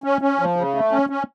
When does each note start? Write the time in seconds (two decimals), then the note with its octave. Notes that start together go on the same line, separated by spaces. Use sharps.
0.04 C#4
0.22 C#4
0.39 F3
0.56 C#3
0.75 A3
0.91 C#4
1.10 C#4